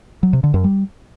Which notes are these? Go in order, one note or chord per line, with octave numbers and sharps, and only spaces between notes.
F#3
C3
D3
F#2
G3